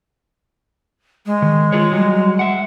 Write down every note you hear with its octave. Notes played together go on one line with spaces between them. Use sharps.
G#3
D#3
F4 G#4 C#5
F#3 G3
E5 F#5